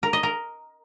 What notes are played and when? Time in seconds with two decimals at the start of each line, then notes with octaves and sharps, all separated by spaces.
0.03 A#4
0.13 D#5
0.23 A#4